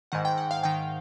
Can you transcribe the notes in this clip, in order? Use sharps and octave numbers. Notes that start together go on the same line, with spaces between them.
G#2 D#3 F#5
G5
F#5
F5
G#2 D#3 G5